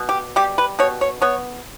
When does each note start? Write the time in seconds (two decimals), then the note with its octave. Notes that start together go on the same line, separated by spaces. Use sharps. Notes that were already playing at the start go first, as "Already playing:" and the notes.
Already playing: B2
0.09 G4
0.36 G3 G4
0.58 B4
0.79 B2 C#5
1.01 C#5
1.22 B3 C#5